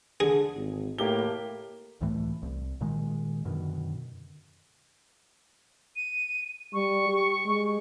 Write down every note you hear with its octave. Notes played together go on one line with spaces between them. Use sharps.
D3 G#4
G#1
A2 A#3 G4 G7
C#2 A2 E3 A3
C2
A#2 D#3 G#3
F#2 B2 D3 D#3
D#7
G3 C#6
G4
G#3